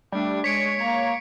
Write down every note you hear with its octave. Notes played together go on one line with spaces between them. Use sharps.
G3 A3 D4 G#6
G#3 C#5 B6 C#7 D7
A#3 A#5